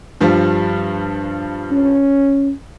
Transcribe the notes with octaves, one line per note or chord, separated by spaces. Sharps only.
G2 F3 G3
C#4